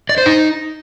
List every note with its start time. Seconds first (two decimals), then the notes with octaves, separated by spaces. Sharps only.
0.09 D5
0.18 C5
0.26 D#4